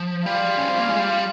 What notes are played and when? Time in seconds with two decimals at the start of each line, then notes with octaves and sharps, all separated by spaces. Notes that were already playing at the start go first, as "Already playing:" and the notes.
Already playing: F3
0.26 G3 F4
0.57 C#4
0.69 C4
0.78 A#3
0.89 G#3
0.99 G3